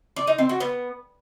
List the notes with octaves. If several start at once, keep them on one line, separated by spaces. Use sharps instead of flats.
D5
D#4
C4
F#4
B3